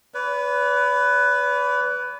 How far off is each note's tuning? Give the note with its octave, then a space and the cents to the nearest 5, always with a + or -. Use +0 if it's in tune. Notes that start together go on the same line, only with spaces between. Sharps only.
B4 +10 D5 -45